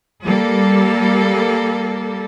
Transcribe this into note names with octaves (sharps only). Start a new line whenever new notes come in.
G3 A#3 A4